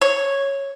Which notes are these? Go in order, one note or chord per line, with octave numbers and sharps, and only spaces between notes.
C#5